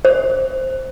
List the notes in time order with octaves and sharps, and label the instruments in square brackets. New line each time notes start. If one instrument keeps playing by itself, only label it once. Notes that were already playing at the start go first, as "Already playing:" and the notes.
[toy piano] C5